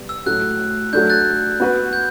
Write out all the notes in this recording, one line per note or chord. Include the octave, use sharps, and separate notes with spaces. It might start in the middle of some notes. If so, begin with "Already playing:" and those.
Already playing: C3 G3 B3
E6
A2 F#3 A3 F#6
F#3 A3 D4 G6
F#6 A6
B3 F#4 B4
G6